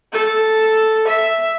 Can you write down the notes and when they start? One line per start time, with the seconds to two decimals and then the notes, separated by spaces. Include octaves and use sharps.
0.13 A4
1.08 E5